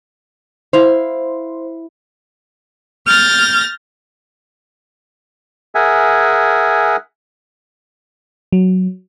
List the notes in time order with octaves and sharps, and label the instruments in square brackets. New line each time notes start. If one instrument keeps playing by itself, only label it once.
[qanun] E4 F5 [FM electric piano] C5
[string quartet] F6 G6 A6 A#6
[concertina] G#4 A#4 E5 F#5 G#5
[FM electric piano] F#3